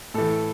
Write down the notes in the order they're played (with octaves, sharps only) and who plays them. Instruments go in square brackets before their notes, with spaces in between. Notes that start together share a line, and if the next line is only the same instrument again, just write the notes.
[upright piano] A2 E3 A4